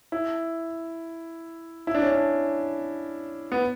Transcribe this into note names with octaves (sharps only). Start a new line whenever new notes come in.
E4
E4
D4
C#4
D4
B3